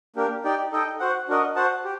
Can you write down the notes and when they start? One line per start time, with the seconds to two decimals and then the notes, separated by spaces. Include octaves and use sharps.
0.16 A#3 D4 G4 A#4
0.44 D#4 G4 D5 G5
0.72 D#4 A4 D#5 G5
1.00 F#4 C5 F#5
1.28 D4 F#4 A#4 D#5
1.56 F#4 C5 F#5 A5
1.84 G4